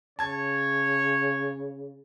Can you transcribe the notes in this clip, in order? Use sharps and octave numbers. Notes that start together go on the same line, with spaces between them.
C#3 C#5 A5 G#6